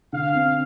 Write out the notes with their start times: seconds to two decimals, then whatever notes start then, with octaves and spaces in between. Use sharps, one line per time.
0.13 D3 F5
0.35 C4